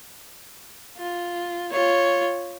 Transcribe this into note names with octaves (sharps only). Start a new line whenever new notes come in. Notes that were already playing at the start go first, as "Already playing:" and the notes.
F4
F4 C#5